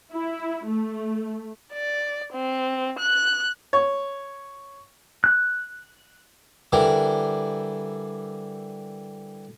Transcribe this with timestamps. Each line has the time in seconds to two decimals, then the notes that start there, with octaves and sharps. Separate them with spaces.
0.12 E4
0.66 A3
1.73 D5
2.34 C4
2.99 F#6
3.73 C#5
5.24 F#6
6.72 D3 E3 G3 A#4